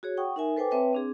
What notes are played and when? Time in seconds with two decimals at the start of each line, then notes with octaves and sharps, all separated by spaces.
0.03 F#4 G#4 C#5
0.17 F#5 G5 C#6 D#6
0.36 D#4 A#4 E5 G#5
0.56 A4 B4 C5 G5 G#5 D6
0.71 C4 B4 C#5 E5 G5 A5
0.93 C4 D4 G#4